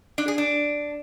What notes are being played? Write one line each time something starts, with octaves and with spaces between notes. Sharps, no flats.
D4
G#4
D4